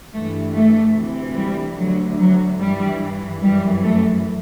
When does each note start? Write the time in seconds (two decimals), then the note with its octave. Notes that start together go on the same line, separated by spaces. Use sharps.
0.14 G2 E3 A3
0.55 A3
0.97 D2 C3 E3
1.37 G3
1.78 D2 D3 F#3
2.19 F#3
2.60 G2 E3 G3
3.42 F#2 E3 G3
3.83 A3